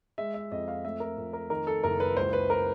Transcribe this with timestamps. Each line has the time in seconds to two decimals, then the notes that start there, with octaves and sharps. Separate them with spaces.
0.18 G#3 E5
0.34 E5
0.52 F2 D#5
0.68 F5
0.85 A3 E5
1.00 A#4
1.17 F2
1.33 A#4
1.50 D#3 A#4
1.67 A4
1.84 F#1 A#4
2.00 B4
2.17 C#2 C5
2.33 B4
2.50 A#4